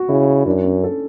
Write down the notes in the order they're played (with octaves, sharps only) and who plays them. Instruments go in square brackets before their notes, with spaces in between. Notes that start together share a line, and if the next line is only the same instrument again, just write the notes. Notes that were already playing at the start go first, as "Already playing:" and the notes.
Already playing: [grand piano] F#4
[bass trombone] C#3 [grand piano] E4
[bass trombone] F#2 [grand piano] D4
[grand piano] C#4
A4